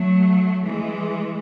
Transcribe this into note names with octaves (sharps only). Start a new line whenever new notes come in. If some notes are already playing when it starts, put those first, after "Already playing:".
Already playing: F#3 A3
E3 G#3